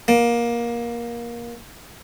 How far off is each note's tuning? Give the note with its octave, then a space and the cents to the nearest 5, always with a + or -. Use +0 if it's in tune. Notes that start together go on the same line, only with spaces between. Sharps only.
A#3 +20